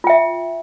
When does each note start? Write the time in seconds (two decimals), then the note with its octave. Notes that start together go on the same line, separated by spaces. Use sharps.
0.04 F4
0.07 G5
0.10 E5